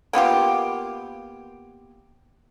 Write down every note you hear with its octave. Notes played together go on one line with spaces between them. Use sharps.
A#3 B3 F4 G4